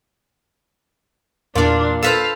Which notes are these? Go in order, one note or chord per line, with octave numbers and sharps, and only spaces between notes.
E2 A#2 D4 F4 D5
A4 B4 C5 F5 E6 B6